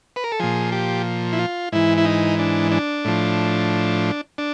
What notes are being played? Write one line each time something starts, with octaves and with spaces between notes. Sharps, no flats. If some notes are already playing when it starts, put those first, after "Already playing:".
B4
A#4
A4
A#2 F3 G#4
G4
E4
F4
G#2 E3 E4
E4
D#4
D4
D4
A2 F3
D4